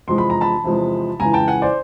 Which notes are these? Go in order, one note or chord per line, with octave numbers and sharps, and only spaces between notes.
E2 C3 F3 G#3 C6
B5
A#5
A5 B5
E2 C3 F3 G#3
C#2 C#3 E3 G#5 A#5
G5 A5
F#5 G#5
C5 D5